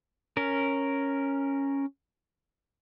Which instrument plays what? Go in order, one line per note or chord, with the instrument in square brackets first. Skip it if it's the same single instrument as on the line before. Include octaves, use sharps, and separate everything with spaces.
[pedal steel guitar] C#4 A#4